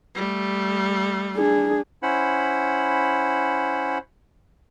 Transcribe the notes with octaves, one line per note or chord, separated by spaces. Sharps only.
G3 A3
D4 G#4
C#4 E4 C5 F#5 B5